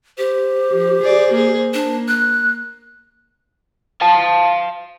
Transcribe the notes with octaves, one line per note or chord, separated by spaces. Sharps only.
G4 C5
F3
G#4 D5
A#3 G#4
A#3 D4
F#6
F5 A5